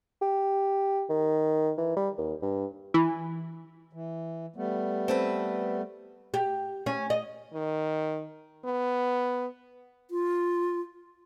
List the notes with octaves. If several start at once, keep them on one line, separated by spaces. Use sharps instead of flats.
G4
D#3
E3
G3
D#2
G2
E3
E3
G3 A3 B3
C4 A4 B4
G4
C#4
D#5
D#3
B3
F4